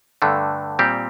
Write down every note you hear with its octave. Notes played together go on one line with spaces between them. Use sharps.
G2 D3 A3
A#2 G3 C4 G4